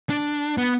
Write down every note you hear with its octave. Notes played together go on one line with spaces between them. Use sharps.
D4
B3